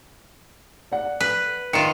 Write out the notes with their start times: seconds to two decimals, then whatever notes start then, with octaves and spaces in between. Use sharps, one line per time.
0.92 D5 F#5
1.20 B4
1.73 D#3 F4 C#7 E7